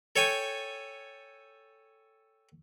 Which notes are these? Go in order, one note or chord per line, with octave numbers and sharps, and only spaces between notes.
A4 C#5 G5 G#5